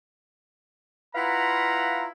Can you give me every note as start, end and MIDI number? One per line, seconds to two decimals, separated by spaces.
1.15 2.07 64
1.15 2.07 65
1.15 2.07 71
1.15 2.07 77
1.15 2.07 78
1.15 2.07 82